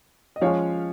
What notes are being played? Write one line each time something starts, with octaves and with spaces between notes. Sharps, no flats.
D#5
F3 G#3 C#4 C#5 F5